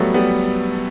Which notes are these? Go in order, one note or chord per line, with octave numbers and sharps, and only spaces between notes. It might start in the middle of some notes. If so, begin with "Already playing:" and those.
Already playing: F#3 G3 A3 B3
G3 B3